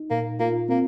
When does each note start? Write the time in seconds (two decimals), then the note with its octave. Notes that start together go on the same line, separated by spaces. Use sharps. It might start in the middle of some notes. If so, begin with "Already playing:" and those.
Already playing: D#4
0.11 A#2 A#3
0.40 A#3 F4
0.69 A#3 C4